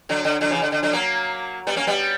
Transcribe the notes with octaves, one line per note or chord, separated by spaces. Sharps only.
D3 F#3
D3
D3 F#3
C#3 E3
D3
D3
D3 F#3
F#3 A#3
G3 B3
A#3 C#4
G3 B3